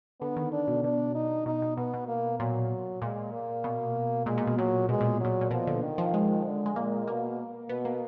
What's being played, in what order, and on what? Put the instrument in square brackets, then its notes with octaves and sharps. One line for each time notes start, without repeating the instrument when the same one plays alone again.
[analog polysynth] D3 [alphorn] B3
[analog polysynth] D#3
[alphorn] D4
[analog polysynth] B2
[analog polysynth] B2 [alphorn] D4
[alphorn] D#4
[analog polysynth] B2 [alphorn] D#4
[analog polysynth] B2
[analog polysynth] B2 [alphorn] B3
[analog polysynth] B2
[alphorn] A#3
[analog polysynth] A#2 [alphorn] F#3
[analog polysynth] A#2 [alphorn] G#3
[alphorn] A#3
[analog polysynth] B2
[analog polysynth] A#2 [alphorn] G#3
[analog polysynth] A#2
B2
[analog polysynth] A#2 [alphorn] F#3
[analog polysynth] B2 [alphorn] G#3
[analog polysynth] A#2
[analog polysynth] A#2 [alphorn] F#3
[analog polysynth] A#2
[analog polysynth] B2 [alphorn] F3
[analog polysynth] D3
[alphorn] D#3
[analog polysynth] F3
G#3
[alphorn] D3
[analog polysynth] G#3
[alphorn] A#2 [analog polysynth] A#3
[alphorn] B2 [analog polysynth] A#3
[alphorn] B2 [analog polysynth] B3
[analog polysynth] A#3